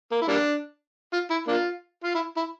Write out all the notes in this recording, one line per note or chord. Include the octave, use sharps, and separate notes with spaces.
A#3
E4
G3 A#3 D4
F4
E4
A#3 D4 F4
F4
E4
E4